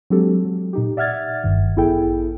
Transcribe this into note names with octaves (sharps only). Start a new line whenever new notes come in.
F#3 G#3 C4 D4 G4 A4
F#3
A#2 D#4 G4
D5 E5 F#5 F6 G#6 A6
G1 G2 D#3
A1 B3 E4 G#4 A4 G5